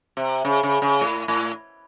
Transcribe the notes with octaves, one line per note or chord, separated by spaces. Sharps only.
C3
C#3
C#3
C#3
A2
A2